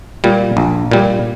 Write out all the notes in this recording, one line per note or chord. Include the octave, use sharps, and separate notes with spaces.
A#2 G3
A#1
A#2 G3